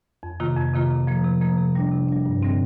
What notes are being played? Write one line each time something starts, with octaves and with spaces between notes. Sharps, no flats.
F2
C3 D#3 A#3 F4
F2
C3 D#3 A#3 F4
C3
F3 A#3
C3
F3 A#3
C3
G3 D4
C3
G3 D4
G2
D3 G3 C4